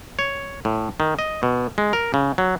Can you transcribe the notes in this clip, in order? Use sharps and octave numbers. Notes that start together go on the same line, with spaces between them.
C#5
A2
D#3
D#5
B2
G#3
A#4
C#3
F#3